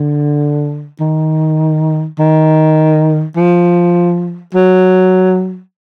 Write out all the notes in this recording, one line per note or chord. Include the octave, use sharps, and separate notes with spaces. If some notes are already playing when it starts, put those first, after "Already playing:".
Already playing: D3
D#3
D#3
F3
F#3